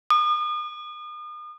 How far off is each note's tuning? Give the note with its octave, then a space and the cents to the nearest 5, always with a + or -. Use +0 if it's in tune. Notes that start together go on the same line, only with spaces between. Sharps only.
D#6 -40